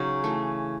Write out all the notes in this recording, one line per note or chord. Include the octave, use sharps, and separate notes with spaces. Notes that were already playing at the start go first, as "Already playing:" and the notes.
Already playing: C#3 F#3 C#4 D#4
E3 A3